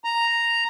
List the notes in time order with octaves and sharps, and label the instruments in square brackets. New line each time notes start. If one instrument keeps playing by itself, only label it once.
[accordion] A#5